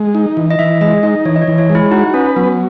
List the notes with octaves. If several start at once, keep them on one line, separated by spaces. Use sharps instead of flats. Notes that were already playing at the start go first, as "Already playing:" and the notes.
Already playing: G#3
D#4
E3
D#5
E3 E5
G#3 D#5
D#4 D#5
E3 C#5
D#5
C#5
E3
C#5
G#3
E4
D#4 F#4
C#4 B4
F#3 B3